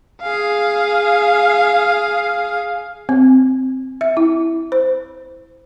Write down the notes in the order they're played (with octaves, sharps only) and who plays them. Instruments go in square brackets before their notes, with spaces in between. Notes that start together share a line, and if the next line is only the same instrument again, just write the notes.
[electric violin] G#4 F5
[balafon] C4
E5
E4
C5